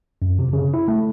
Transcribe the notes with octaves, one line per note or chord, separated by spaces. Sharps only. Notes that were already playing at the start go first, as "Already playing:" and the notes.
F#2
C3
C#3
E4
A3